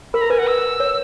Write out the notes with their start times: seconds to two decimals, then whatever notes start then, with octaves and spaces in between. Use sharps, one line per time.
0.13 A#4 B5
0.21 A#5
0.30 B4 G#5
0.38 F#5
0.47 E6
0.80 C#5